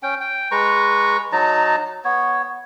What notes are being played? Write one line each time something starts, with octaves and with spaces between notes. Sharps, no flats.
C#4 G5
G5
G#3 B4 A#5 C#6
F#3 D#4 A5 A#5
B3 C#5